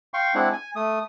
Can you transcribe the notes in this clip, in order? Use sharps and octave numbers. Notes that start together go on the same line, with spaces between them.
F5 G5 C6 C#6
G#3 C4 D4 E4 F#5
G#5
A3 D#6